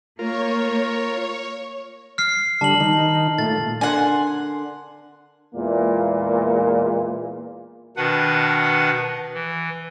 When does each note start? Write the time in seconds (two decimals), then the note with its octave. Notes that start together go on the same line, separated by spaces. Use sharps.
0.19 A#3 F4 A#4 C#5
2.18 F6 C7
2.61 D3 G3 A5 F#7
2.80 D#3 D#4
3.38 A#2 A3 A6
3.81 D3 A#4 F#5 G#5 C6
5.54 E2 A#2 G#3 A#3
7.97 B2 D#3 D4 B4 F#5
9.34 E3